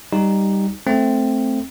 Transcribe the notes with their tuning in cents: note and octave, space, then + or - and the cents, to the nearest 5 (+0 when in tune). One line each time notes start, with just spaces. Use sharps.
G3 +0 D#4 +0 G4 +0
A3 +0 C4 +0